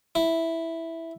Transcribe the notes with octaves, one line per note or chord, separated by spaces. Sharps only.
E4